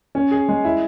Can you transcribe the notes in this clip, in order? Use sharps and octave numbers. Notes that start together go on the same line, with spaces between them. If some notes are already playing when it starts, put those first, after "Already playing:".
C#4
G#4
G#3
E4